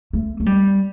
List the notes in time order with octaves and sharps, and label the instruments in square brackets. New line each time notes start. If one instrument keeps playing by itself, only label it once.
[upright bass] A3
A3
G3